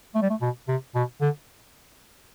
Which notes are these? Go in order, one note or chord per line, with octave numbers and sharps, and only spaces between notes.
A3
G3
A3
B2
C3
B2
D3